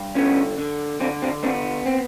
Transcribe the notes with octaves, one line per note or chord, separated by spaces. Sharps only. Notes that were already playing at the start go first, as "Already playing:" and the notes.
Already playing: G2
D3 B3 C#4
D3
D3 C4 D4
C4 D4
B3 C4 D4
C4